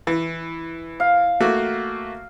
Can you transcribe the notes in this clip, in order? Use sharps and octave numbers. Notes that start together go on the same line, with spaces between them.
E3
F5
A3 A#3 F#4